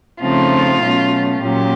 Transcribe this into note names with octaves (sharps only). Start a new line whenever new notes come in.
C#3 F3 A3 C4 D#4 F4
B2 F#3 A3 C#4
A#2 F#3 A#3 C#4 G4